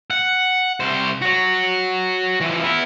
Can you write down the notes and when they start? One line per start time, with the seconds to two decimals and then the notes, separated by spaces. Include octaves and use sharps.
0.10 F#5
0.80 C2 C5
1.22 F#4 C#5
2.41 E3 F3
2.63 B3 E4